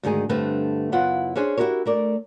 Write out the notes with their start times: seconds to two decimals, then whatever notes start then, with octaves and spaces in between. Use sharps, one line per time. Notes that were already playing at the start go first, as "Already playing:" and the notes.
0.03 D2 G#2 D#3 G#4
0.29 G2 D3 A3 C4 B4
0.92 F#2 C#3 B3 E4 F4 F#5
1.36 C#4 D4 G#4 C5
1.57 E4 F#4 G4 A#4 C#5
1.86 A3 A#4 D5